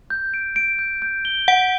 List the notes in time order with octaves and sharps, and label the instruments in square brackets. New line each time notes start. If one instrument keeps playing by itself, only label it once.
[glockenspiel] G6
D7
D7
G6
G6
G7
[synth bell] F#5 [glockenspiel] D7